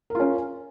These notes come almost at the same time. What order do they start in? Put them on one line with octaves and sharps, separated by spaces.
A#4 F4 C#4